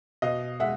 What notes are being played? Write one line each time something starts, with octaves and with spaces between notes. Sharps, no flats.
B2 D#5 F5
G#3 E5 F#5